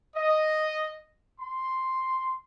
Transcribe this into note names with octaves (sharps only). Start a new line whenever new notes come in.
D#5
C6